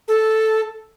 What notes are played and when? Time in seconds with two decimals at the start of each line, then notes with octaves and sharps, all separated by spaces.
0.08 A4